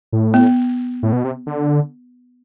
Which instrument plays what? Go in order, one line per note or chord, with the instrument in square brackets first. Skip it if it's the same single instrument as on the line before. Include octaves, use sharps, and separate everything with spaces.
[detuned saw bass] A2
[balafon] B3
[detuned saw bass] A2
B2
C3
D3